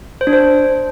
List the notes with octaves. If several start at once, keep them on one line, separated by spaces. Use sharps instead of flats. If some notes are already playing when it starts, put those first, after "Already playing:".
C5
D4
C5